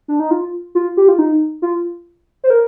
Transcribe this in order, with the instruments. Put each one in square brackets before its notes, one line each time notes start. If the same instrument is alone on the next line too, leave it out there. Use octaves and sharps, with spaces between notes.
[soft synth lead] D4
D#4
F4
F4
G4
F4
D#4
F4
C5
A#4